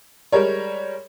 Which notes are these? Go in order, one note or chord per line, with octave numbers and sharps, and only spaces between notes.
G3 G#3 A#4 C#5